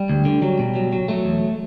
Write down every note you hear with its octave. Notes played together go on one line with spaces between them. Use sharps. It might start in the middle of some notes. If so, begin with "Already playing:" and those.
Already playing: G3
D2
D3
F#3
B2
F#3
F#3
F#3 A3
E2